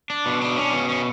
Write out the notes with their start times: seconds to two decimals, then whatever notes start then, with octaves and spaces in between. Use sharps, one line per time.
0.10 D4
0.26 B2
0.41 D4
0.57 C#4
0.73 B2
0.89 C#4